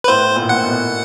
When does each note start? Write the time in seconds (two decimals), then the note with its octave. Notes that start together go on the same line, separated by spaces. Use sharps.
0.04 B4
0.08 A2 C5
0.36 A#2
0.42 A2
0.49 A#2 F#5
0.63 B2